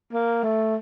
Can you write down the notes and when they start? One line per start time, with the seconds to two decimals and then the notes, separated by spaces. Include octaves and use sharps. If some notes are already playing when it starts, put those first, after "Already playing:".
0.13 A#3
0.43 A3